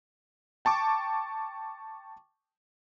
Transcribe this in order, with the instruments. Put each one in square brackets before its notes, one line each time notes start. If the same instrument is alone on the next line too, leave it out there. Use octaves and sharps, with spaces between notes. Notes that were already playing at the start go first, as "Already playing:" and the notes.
[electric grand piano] G5 A5 C#6 D6